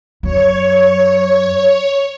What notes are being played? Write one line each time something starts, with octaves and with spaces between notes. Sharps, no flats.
F#2 C#5